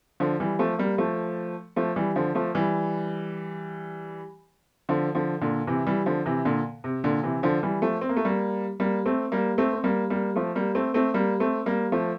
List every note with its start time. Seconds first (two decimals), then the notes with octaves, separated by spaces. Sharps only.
0.20 D3 F3
0.40 E3 G3
0.59 F3 A3
0.78 G3 A#3
0.98 F3 A3
1.76 F3 A3
1.96 E3 G3
2.16 D3 F3
2.35 F3 A3
2.55 E3 G3
4.89 D3 F3
5.15 D3 F3
5.41 A#2 D3
5.67 C3 E3
5.86 E3 G3
6.06 D3 F3
6.26 C3 E3
6.45 A#2 D3
6.84 C3
7.04 A#2 D3
7.23 C3 E3
7.43 D3 F3
7.63 E3 G3
7.82 F3 A3
8.01 C4
8.09 A#3
8.16 A3
8.25 G3 A#3
8.80 G3 A#3
9.06 A3 C4
9.32 G3 A#3
9.58 A3 C4
9.73 C4
9.84 G3 A#3
10.10 G3 A#3
10.36 F3 A3
10.55 G3 A#3
10.75 A3 C4
10.94 A3 C4
11.14 G3 A#3
11.40 A3 C4
11.66 G3 A#3
11.92 F3 A3